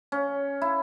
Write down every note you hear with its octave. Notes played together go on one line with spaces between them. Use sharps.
C#4
E4